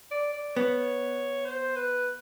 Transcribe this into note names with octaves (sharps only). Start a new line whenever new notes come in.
D5
D5
B3 C#5
C5
B4